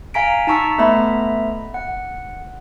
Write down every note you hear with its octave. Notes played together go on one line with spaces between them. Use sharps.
F5 G#5 A#5 B6 D7
D#4 A5 A#5 C#6 E6 B6
A3 B3 D#5 E5 A#5 B5
F#5